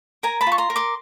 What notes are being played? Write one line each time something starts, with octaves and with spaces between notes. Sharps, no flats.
A#4 G#5 A#5
A5 B5
F4
C#6
A#5 C6
A#4
C6 D6